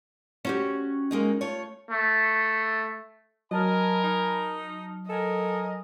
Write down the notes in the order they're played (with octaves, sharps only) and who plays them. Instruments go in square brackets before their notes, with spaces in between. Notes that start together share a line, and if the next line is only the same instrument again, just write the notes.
[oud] C#4 F#4 G4
[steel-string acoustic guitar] G#3 A#3 D#4
A3 F4 C#5
[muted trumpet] A3
[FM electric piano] F#3 A5 F6 [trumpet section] A#4 G#5 B5 [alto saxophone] D#5
[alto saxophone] D#4
[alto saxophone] A4 [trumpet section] A#4 G#5 [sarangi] D#5